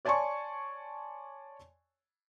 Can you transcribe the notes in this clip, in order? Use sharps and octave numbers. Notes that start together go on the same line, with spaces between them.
C#5 D5 G#5 A5 C6 C#6